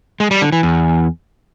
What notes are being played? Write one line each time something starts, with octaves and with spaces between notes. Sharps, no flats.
G#3
G3
D3
E3
E2